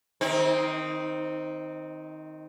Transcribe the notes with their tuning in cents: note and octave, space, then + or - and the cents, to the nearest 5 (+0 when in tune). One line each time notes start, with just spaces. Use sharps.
D#3 +0 C4 +0 D#4 +40